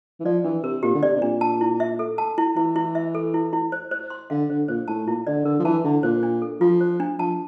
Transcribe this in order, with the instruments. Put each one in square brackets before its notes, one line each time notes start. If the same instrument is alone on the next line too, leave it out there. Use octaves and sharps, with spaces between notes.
[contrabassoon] E3
[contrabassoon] F3 [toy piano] D5
[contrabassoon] E3 [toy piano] D4
[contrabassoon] C3 [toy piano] A#4
[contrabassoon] A#2 [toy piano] G4
[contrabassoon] D3
[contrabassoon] C3 [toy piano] D5
[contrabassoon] C3
[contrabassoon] A#2 [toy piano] D4
[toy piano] A5
E4
E5
A4
A5
E4
[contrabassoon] E3 [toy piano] E4
[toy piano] E4
E5
A4
E4
E4
C5
C5
C6
[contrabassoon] D3 [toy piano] F5
[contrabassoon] D3 [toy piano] C5
[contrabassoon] A#2 [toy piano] C5
[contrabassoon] A2 [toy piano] A5
[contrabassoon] A#2 [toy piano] E4
[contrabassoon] D3 [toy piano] D5
[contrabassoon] D3 [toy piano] A#4
[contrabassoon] F3
[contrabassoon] E3 [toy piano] A5
[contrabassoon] D3 [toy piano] E4
[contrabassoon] A#2 [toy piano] C5
[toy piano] D4
A4
[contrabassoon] F3 [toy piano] F4
[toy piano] C5
D4
[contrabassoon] F3 [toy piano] A5